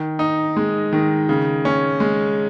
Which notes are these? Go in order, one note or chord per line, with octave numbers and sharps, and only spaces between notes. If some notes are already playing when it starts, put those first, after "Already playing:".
Already playing: D#3
D#4
G#3
D#3
C#3
C#4
G#3